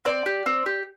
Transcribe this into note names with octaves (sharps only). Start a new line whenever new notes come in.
C4 D5
G4
C4
G4